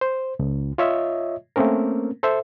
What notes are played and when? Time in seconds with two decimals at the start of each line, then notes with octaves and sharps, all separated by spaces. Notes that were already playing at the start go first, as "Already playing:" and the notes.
0.01 C5
0.39 C#2
0.78 F4 C#5 D#5 E5
1.56 A3 A#3 C4 C#4 A#4
2.23 A4 C5 E5